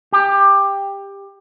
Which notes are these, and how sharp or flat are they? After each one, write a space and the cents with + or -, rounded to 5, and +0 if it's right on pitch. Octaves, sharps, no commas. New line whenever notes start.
G4 +15